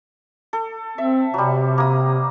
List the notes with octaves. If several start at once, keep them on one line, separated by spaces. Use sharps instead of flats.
A4
C4 E5
C3 F#3 G3
A#3 D#6